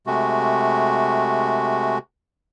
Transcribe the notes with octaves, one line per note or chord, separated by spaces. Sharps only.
C3 G#3 A3 F#4